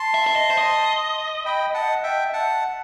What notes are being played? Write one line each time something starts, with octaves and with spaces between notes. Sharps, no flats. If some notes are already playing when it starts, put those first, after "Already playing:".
Already playing: A5 C6
E5
E5
D#5
C5
D#5
G5 B5
F#5 A5
E5 G5
F#5 A5